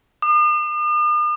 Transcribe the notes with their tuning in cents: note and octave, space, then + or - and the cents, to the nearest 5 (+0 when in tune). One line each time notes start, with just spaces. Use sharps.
D#6 -45